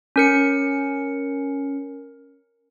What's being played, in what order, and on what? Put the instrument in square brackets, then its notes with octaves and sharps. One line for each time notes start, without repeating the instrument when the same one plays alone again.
[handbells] C#4 A#4 C#7